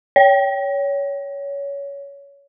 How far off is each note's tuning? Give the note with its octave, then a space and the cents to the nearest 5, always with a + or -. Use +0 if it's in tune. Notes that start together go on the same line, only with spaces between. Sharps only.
C#5 +20